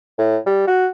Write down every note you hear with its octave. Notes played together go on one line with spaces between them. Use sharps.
A2
G3
F#4